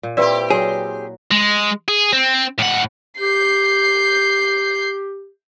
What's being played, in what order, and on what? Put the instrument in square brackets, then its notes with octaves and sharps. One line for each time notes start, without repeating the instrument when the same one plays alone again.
[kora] A#2
[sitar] C4 G4 [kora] E4 E5 [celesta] B4 D5
[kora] F#3 [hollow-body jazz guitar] G#4
[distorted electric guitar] G#3
G#4
C4
A2 F#5
[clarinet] G4 [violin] G6 C7